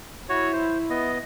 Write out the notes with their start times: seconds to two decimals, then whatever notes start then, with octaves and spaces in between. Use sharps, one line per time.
0.29 E4 F#4 C#5
0.53 C5
0.90 B3 D#5